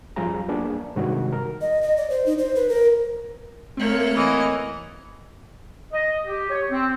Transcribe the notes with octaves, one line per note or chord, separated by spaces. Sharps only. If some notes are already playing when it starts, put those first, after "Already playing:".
F#2 F3 G3 F4 G#4 A#5
A#3 B3 D4 G#4
G2 C3 D#3 G#3 F#4
A#4
D#5
D#5
D5
C5
D#4
C5
B4
A#4
A3 A#3 C4 C#5
E3 D#5
D#5
G4
C#5
C4